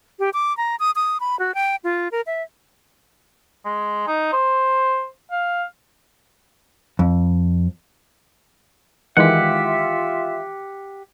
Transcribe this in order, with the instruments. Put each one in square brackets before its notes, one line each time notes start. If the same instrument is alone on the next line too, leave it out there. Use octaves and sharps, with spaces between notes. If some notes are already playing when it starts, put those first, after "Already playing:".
[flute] G4
D6
A#5
D#6
D#6
B5
F#4
G5
F4
A#4
E5
[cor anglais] G#3
D#4
C5
F5
[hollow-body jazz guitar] F2
[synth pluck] D#3 E3 G#3 [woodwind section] F4 E5 [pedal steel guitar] G4 F#5